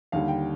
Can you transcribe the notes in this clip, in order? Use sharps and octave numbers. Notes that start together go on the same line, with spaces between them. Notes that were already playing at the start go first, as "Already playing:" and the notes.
D#2 D3 G3 F5
G5